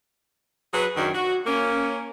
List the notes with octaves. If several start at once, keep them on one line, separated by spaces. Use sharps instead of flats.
F#3 G#4 B4
F#2 D#3 F#3 D4
F#4
A#3 C#4